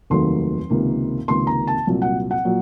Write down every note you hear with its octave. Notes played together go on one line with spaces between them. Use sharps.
F1 D#2 D#3 F#3 A3 C6
C#2 C3 D#3 A#3
C#2 C3 D#3 A#3 C6
A#5
A5
C2 A#2 F#3
F#5
F#5
A#2 F#3